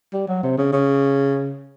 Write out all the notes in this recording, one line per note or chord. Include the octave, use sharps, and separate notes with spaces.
G3
F#3
C3
C#3
C#3